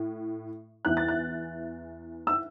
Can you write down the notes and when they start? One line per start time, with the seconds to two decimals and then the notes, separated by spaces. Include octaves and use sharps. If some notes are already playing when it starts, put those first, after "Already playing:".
Already playing: A2
0.85 E2 E3 F#6
0.97 A6
1.08 F#6
2.27 E6